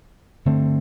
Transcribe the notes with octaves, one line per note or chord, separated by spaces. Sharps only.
G2 D3 A3 C4